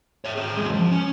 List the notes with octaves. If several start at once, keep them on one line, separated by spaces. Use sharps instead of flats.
C#5 E5
C4 G#4
D#2 G#3
F3
C#4